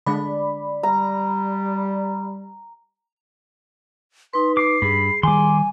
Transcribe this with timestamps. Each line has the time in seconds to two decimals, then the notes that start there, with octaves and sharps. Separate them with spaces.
0.06 D3 G#3 D4 D5 B5
0.83 G3 A#5
4.33 D#4 B4 C6
4.57 D6 C7
4.82 G2 G#4 B5
5.23 D#3 G3 G#5 C6 D6